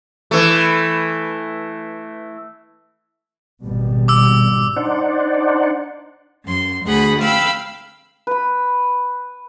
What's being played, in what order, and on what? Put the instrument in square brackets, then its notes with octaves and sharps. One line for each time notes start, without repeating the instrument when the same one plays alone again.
[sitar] E3 A3
[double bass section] G#1 B2 G3
[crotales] D6 E6
[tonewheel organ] D4 D#4 C5 D5 F#5
[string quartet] F#2 C6
D2 G#4 F#5 B5
F5 G5 B5 E6
[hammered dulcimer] B4 B5